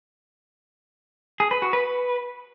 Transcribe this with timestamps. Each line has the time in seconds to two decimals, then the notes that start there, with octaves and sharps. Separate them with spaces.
1.40 G#4
1.51 B4
1.62 F#4
1.73 B4